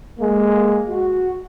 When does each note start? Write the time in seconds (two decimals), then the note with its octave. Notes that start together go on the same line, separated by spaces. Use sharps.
0.20 G#3 A#3
0.89 F#4